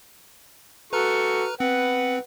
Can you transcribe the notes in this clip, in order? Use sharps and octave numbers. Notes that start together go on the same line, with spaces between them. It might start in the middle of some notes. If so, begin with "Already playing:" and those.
F#4 A4 B4 A#5 C#6 F6
C4 B4 F#5